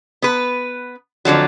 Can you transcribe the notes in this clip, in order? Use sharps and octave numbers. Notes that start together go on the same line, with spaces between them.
B3 B4
F2 D3 F3 F#3